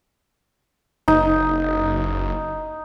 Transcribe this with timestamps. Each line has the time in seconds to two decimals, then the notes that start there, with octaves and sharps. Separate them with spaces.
1.08 F#1 D#4